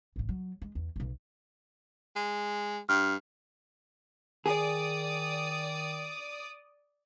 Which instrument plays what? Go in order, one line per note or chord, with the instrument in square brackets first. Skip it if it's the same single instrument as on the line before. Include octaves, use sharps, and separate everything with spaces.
[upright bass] A1 A2
F#3
G#3
E2
E1 B1
[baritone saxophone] G#3
[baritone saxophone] G2 [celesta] F6
[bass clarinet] D#3 [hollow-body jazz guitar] G#4 [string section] D5 D#6